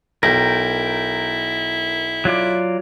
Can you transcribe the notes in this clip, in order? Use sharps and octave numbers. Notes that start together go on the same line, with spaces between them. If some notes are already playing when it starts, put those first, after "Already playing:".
B1 E4 A#4 G5
F#3 F4 D5